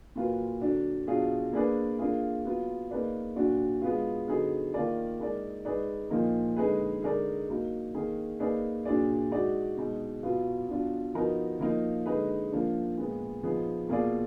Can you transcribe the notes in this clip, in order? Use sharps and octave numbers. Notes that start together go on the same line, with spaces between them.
A#2 F#3 A#3 F4 B4
D3 F#3 D4
B2 F#3 D4 F4 G#4
A#3 D4 G#4 B4 D5
A#3 D4 F4 G#4
F#3 B3 F4
A#3 D#4 G#4 B4 D5
A#2 F#3 D4 F#4
G#3 B3 F4
D3 F#3 B3 D#4 G#4
D#3 A#3 F4 A#4 D5
G#3 D#4 A#4 D5
G#3 D#4 G#4 B4 D5
A#2 F3 A#3 D#4
D3 G#3 D#4 G#4 B4
D3 G#3 D#4 A#4 D5
F#3 A#3 D#4
D#3 A#3 D#4 G#4
A#3 D#4 G#4 B4 D5
A#2 F#3 D4 G#4 D5
G#3 D#4 F#4 D5
B2 G#3 D#4
B2 F#3 B3 F4
B2 F#3 D4 F4
F3 B3 D#4 F#4 A#4
F3 A#3 D#4
D3 G#3 D#4 G#4 B4
F3 A#3 D4
A#2 G#3 B3
F3 B3 D#4 G#4
B2 A#3 F4 G#4 D5